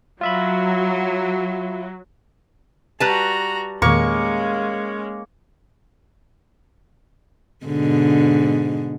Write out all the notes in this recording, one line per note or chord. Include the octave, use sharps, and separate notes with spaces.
F#3 F4 E5 B5
G3 F#4 B4 A5 A#5
E2 A#2 D#3 G#3 A#3 C#4 C#6
G#2 B2 D3